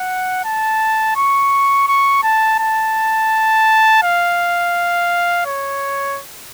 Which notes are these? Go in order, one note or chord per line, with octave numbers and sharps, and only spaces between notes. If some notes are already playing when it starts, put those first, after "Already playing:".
Already playing: F#5
A5
C#6
C#6
A5
A5
F5
C#5